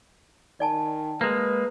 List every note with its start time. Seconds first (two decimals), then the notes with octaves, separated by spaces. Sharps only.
0.60 D#3 D5 G#5 A5
1.21 G#3 A#3 B4